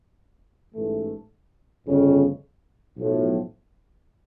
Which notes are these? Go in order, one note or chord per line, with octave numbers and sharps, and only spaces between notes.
A1 G#2 E3 A3
G1 F2 C#3
B1 A2 F3